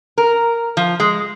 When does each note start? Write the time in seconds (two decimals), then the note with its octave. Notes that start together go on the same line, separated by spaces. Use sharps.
0.18 A#4
0.77 F3
1.00 G#3